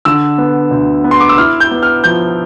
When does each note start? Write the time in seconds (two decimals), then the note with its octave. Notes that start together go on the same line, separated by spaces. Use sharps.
0.05 D3 E6
0.38 B3
0.71 D2
1.04 B3
1.11 C6
1.20 D6
1.29 E6
1.38 E4 F6
1.60 G6
1.71 B3
1.83 F6
2.04 F3 G6